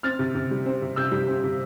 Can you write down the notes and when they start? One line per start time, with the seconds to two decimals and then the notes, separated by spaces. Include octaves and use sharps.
0.03 C4 F6 A6
0.19 C3
0.35 C3
0.51 G3
0.66 C4
0.82 C3
0.96 C3 E6 G6
1.12 G3
1.27 C4
1.44 C3